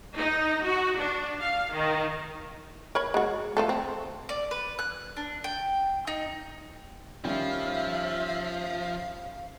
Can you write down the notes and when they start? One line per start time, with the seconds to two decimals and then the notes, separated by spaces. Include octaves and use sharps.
0.15 D#4
0.63 F#4
0.98 D4
1.41 F5
1.73 D#3
2.95 A#4 C#5 B5
3.14 G#3 F#4
3.57 F3 A3 A4
3.69 C4
4.29 D5
4.51 B4
4.79 F#6
5.17 D4
5.44 G5
6.07 D#4
7.25 D#3 F3 G3 C#4 E5 F5